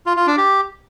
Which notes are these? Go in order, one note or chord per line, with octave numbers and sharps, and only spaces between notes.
F4
F4
D4
G4